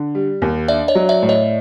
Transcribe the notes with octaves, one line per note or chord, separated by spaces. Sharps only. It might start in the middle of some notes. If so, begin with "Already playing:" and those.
Already playing: D3
G3
D#2
D4 D5 E5
C#5 D#5
F#3
D5 E5
A2
C#5 D#5